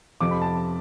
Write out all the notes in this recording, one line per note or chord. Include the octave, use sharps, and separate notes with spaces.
F2 C3 F3 D6
B5
A5